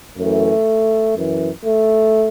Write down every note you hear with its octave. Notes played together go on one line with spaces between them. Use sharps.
F#2 E3 A3
F#2 E3
A3